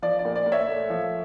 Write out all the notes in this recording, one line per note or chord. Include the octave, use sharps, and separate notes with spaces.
F3 D5
D5
A#2
D5
A#2
C#5 E5
A3
F3